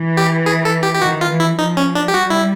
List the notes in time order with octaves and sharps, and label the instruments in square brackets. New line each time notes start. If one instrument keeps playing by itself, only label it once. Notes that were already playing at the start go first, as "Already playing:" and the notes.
Already playing: [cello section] E3
[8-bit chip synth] G4
G#4
A4
G4
G4
[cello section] D#3 [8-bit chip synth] F#4
[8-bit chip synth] F4
[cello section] E3
[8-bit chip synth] E4
[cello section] F3 [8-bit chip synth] D#4
[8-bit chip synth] C#4
D4
G4
[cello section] G3 [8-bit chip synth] F#4
[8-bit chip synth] E4